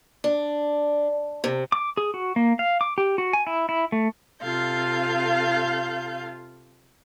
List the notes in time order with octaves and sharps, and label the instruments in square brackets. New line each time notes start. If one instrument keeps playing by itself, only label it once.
[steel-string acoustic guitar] D4
C3
[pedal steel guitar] D6
G#4
F#4
A#3
F5
D6
G4
F#4
G#5
E4
E4
A3
[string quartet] C3 F4 A4 F5 G6